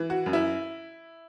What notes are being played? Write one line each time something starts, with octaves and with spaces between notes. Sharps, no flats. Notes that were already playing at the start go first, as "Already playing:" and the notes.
Already playing: E3
F#4
F#2
E4